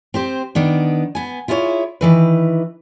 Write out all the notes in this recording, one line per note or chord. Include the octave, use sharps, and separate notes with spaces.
C4 G4 C5
D#3 B3 D4
B3 G#5
E4 F4 G#4 A4 C#5
D#3 E3 B4